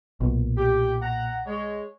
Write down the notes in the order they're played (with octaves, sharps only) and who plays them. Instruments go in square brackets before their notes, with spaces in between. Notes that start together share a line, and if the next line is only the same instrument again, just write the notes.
[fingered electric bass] B1 [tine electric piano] A#2
[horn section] G4
F#5 A#5
G#3 C#5